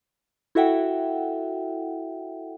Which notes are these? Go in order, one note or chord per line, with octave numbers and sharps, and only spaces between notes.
E4 F#4 A4 E5 F#5 G5